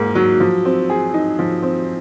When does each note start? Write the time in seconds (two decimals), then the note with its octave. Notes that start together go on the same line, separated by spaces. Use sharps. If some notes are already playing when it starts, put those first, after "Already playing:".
Already playing: G#2 A#3 D#4
0.15 F#3
0.40 F3
0.65 C4
0.90 G#4
1.14 D#4
1.39 F3
1.62 C4